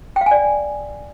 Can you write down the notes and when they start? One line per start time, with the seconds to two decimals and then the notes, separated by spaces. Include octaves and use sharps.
0.16 G5
0.21 F5
0.26 G#5
0.31 D5